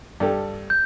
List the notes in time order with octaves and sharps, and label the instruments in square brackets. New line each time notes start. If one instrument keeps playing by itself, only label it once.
[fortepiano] G2 G4 A4
[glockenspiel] G6